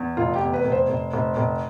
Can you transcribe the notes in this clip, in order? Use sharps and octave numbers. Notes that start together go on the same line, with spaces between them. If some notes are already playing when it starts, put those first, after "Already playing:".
Already playing: E2
F1 F4
G4
E2
B4
F1
C5
F1
F1
F1